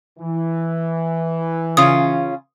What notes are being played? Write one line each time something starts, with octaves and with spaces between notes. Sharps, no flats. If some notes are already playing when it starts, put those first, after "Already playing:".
E3
C#3 C#4 F4 D#6